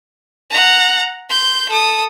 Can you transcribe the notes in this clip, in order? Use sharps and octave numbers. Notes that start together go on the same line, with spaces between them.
F#5 A#5
C6 G6
A4 D#6